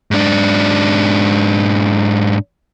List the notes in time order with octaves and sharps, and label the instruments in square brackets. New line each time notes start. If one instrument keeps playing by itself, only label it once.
[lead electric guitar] G#2 D4